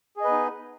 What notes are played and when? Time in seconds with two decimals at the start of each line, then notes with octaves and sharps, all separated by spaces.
0.17 G#4
0.21 D#5
0.24 B4
0.28 B3
0.32 D#4